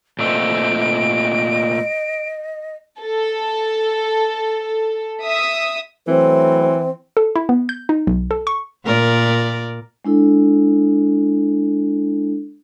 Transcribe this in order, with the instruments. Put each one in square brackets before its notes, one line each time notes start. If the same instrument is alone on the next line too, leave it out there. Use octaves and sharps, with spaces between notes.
[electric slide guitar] A#2 A3 C4 [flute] D#5 [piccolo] D7
[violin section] A4
E5 D#6
[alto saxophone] E3 [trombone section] F#3 A3 B4 [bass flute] C4
[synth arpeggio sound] A4
E4
B3
G6
D#4
B1
A4
C#6
[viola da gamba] A#2 A#4 D5
[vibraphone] G#3 D4 E4 A4